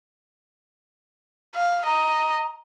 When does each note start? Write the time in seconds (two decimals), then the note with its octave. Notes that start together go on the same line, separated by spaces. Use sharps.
1.55 F5
1.85 D#5 A#5